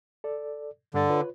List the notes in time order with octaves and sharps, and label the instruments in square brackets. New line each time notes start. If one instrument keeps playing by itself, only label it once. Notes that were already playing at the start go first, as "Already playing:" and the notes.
[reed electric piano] A4 D5
[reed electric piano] G2 A6 [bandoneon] D3
[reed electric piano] F4 B4 C#5